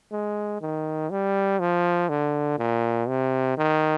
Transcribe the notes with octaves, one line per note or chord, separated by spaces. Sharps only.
G#3
D#3
G3
F3
D3
A#2
C3
D#3